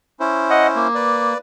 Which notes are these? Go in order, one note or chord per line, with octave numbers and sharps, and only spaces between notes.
C#4 E4 C5
D#5 F#5
A#3
B4 D5